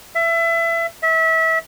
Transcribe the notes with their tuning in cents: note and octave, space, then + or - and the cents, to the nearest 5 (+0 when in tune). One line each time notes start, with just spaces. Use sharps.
E5 +25
E5 -25